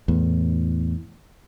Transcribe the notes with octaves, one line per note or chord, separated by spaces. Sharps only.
E2 A2